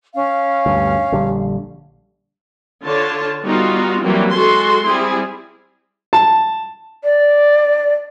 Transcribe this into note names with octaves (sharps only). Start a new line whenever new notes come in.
C#4 F5
D2 G2
A#1 D3 G3
D3 D4 F4 C#5 A5
G3 B3 D#4 F4 F#4
E3 F#3 G3 A#3 C4
G#3 F#4 A4 C6
G3 C4 E4 G#4
A5
D5